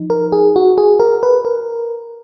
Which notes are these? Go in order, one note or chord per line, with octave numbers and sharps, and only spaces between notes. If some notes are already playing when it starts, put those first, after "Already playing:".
Already playing: F3 D#4
A#4
G#4
F#4
G#4
A#4
B4
A#4